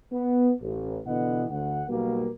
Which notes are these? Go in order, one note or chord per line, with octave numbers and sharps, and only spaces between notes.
B3
A1
B2 D3 E3 B3 D#5 F#5
D2 F#5
B1 B2 G3 A#3